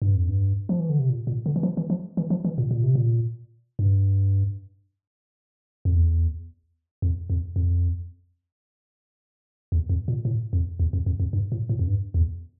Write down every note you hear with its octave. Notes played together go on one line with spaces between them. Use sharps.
G2
F2
G2
F3
E3
D3
C3
A#2
A#2
D3
E3
F3
E3
F3
E3
F3
E3
A#2
A#2
C3
A#2
G2
F2
E2
F2
F2
F2
E2
F2
A#2
A2
F2
E2
F2
F2
F2
G2
A2
A2
F2
G2
E2